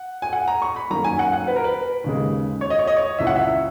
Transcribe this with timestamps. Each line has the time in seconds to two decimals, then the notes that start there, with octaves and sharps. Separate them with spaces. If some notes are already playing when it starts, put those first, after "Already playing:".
Already playing: F#5
0.22 G#5
0.33 F#5
0.48 A#5
0.62 C#6
0.76 B5
0.90 F#2 D#3 F#3 A#3 A#5
1.05 G#5
1.19 F#5
1.33 F#5
1.47 B4
1.56 A#4
1.64 B4
2.04 D#2 C#3 G#3
2.61 C#5
2.70 D#5
2.79 C#5
2.87 D#5
2.96 C#5
3.19 C#2 C#3 E3 E5
3.27 F#5
3.36 E5